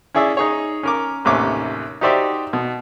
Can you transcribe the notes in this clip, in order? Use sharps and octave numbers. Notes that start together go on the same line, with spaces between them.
C#4 E4 G#4 D5 E5
D#4 G#4 C#5
C#4 A#4 D6
A1 D#2 C3 C#4 D6
D#4 F#4 G4 C5 D5 E5
B2